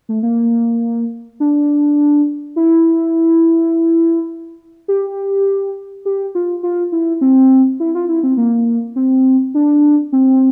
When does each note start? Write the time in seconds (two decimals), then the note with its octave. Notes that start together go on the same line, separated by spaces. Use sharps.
0.09 A3
0.23 A#3
1.40 D4
2.56 E4
4.88 G4
6.05 G4
6.35 F4
6.63 F4
6.92 E4
7.21 C4
7.80 E4
7.95 F4
8.09 E4
8.23 C4
8.37 A#3
8.96 C4
9.54 D4
10.13 C4